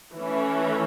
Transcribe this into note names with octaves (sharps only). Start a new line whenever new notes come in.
E3 A3 C#4